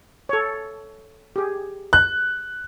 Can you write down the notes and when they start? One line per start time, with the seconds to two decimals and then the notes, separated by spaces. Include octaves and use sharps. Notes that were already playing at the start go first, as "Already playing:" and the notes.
0.29 A4 C#5
1.36 G4 G#4
1.93 F#6